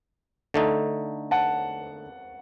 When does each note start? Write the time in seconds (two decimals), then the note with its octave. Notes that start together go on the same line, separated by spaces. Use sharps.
0.54 D3 A3 D#4
1.31 F#5 A5